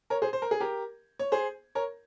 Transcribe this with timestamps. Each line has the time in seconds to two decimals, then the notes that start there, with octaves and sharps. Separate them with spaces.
0.10 A#4 C#5
0.22 G#4 C5
0.33 C5
0.42 A#4
0.51 G#4
0.60 G4 A#4
1.19 C#5
1.32 G#4 C5
1.75 A#4 C#5